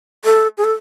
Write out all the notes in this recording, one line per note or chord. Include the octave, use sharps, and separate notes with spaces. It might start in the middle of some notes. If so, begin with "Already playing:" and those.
A4
G#4
A4